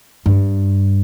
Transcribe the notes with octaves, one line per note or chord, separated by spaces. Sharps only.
G2